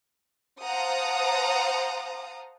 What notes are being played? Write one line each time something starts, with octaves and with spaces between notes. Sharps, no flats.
C5 F5 F#5 A5 A#5 D#6